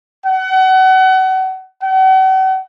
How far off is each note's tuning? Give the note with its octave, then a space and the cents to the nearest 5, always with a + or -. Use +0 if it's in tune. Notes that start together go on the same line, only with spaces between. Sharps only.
F#5 +30
F#5 +45